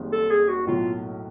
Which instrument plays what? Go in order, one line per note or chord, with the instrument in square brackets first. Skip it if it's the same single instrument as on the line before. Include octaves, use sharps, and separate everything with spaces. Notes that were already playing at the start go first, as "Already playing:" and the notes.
Already playing: [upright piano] F#1 F#2 D#3 G3 C4
[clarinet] A4
G#4
F#4
[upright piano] B1 A2 F#3 [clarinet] F4